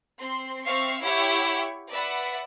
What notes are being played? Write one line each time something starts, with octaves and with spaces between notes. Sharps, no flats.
C4 C6
C4 E5 F5 C#6 C7
E4 G4 C#5 F#5 C#6
B4 D5 E5 F#5 B5